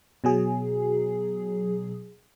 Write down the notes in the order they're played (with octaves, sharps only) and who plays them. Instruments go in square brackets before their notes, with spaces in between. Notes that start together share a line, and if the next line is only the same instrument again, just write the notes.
[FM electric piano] B2 F#3 G#4